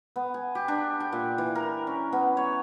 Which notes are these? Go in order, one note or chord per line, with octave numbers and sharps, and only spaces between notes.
B3
G#5
G4
D4
G5
A#2
E3
A#4
C#4
B3
C#5